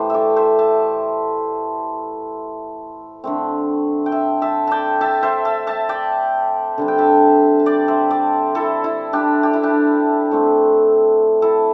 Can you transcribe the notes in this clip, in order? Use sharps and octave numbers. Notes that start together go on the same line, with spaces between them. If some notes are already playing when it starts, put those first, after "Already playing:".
Already playing: A2 E3 A3 G4 C5
A4 D5 E5
C5 E5
E5 A5
D3 A3 C4
G5
E5 A5
E5 A5
D5 G5 A5
E5 A5
C5 E5
E5 A5
E5 A5
D5 G5
D3 G3 C4 A5
G5
E5 A5
A5
D5 G5
C5 E5
A4 D5
E4 A4
E4
D4 G4
G4
E4
D4 G4
A2 A3 C4
E4 A4